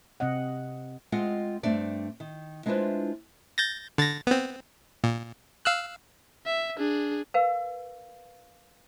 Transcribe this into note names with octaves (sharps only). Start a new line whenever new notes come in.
C3 C4 D#5 F#5
G#3 C4 F4 G#4 D#5 F#5
G2 A3 C4 D4 D5
D#3
G#3 D4 E4 F4 B4 C5
G6 A6 A#6
D3 A6 A#6
B3 C4
A#2
F5 E6 F#6
E5
D4 G#4
A#4 B4 F5